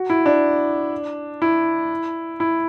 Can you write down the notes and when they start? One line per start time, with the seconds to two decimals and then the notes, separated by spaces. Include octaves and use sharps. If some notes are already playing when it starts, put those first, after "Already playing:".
Already playing: F#4
0.10 E4
0.26 D4
1.42 E4
2.40 E4